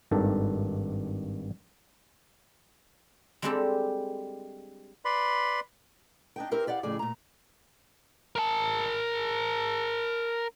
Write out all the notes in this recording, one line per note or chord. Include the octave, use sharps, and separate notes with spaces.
G#1 G2 D#3 A4
G3 G#3 C4 D4 G4 A4
B4 D5 B5 C6
D4 D#4 G5
C4 E4 G4 A#4 C5
G4 D5 F5 F#5
F2 A2 C#3 G#4 D5
A#2 A#5
A#4 A5